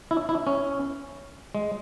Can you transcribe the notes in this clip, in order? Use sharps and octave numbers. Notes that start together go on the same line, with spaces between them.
E4
E4
C#4
G#3